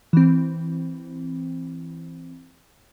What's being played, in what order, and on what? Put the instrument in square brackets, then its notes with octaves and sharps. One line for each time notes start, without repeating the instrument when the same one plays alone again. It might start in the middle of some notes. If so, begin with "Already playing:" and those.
[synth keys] E3 C4